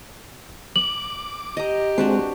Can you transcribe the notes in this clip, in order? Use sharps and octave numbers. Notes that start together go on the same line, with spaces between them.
D6 F#7
G4 D#5 A#5
G#3 C4 D4 F#4 B4